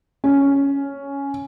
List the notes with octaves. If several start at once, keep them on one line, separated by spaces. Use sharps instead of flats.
C#4